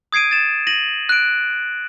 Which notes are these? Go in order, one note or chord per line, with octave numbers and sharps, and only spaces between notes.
D#6 G#6 C7 D7 D#7
A6 E7
A#6 D#7 F#7
F#6 D7